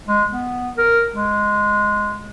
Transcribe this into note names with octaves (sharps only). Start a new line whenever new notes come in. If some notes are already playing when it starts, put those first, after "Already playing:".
G#3
B3
A#4
G#3